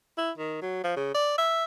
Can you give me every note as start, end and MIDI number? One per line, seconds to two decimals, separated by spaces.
0.18 0.31 64
0.38 0.58 51
0.62 0.81 54
0.84 0.94 53
0.96 1.10 49
1.14 1.36 74
1.38 1.64 76